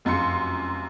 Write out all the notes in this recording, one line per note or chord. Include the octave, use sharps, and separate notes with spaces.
F1 F#2 F4 C6 C#7